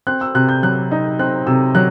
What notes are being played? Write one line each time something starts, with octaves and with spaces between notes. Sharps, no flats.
C4 F#6
E6
C3 F#6
G6
F#3 F#6
D#4
C4 F#6
C3 E6
F#3 F#6